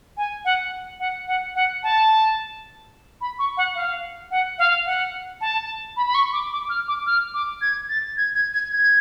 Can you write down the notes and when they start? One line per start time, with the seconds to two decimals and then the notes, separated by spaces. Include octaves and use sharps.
0.17 G#5
0.45 F#5
1.00 F#5
1.28 F#5
1.55 F#5
1.83 A5
3.21 B5
3.39 C#6
3.57 F#5
3.75 F5
4.31 F#5
4.58 F5
4.86 F#5
5.41 A5
5.97 B5
6.07 B5
6.15 C#6
6.33 D6
6.52 D6
6.70 F6
6.88 D6
7.06 F6
7.34 D6
7.61 G#6
7.89 A6
8.17 G#6
8.35 G#6
8.54 G#6
8.72 G#6